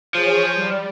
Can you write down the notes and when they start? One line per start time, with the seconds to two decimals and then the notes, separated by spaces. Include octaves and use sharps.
0.15 F3 G#4 C#5
0.55 G3